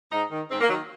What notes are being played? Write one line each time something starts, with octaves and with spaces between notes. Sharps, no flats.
G#2 D#4
D#3
G#2 C4
A#3
D#3 F#3